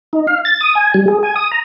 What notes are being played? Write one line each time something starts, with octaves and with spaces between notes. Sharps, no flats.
D#4
F5
A6
D#6
G#5
G3
G#4
G#5
D#6
A#5